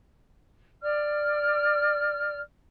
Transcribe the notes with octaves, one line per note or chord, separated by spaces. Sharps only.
D5 F6